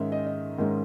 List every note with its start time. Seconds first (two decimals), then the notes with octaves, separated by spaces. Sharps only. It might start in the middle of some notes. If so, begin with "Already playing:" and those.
Already playing: G#2 D#3 G#3 C#4 E5
0.12 D#5
0.27 D#5
0.58 G#2 D#3 G#3 C#4